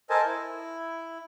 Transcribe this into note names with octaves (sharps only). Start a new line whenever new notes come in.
A4 A#4 C5 D#5 G#5 A5
E4